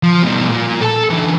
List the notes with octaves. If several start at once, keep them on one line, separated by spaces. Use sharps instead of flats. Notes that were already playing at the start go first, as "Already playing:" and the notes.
F3
B2 G3
A#2
A4 A5
D3 E3